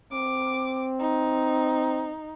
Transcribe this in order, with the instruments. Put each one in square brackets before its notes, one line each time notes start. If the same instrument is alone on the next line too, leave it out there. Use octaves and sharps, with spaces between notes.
[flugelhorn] C4 [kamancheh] D6
[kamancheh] D#4